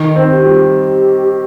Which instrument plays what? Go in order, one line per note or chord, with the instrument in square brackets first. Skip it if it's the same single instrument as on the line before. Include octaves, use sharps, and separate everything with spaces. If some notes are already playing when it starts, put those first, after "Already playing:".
Already playing: [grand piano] D#3 [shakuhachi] D#4
[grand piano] C4
[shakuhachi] G4
[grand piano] G3